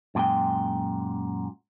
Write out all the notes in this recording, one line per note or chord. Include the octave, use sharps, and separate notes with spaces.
F#2 A#2 C#3 G#3 G5